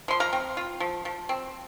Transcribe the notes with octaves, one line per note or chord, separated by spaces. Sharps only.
F3 C6
F5 A#5
C4
F4
F3
F3
C4